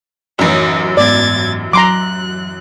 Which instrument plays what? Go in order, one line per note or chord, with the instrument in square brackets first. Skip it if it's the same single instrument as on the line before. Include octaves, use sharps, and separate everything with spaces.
[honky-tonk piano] A1 F#2 [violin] D#4
[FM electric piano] G#2 B3 [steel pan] D5 [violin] G#6 A6
[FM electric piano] F#3 [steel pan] A#5 C6 D6 [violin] F#6